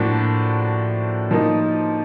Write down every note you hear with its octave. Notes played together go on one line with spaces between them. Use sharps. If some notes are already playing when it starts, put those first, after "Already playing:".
Already playing: A2 F3 A#3 D4 F#4
F3 A#3 D#4